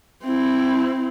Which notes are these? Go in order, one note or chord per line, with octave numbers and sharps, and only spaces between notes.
C4 E4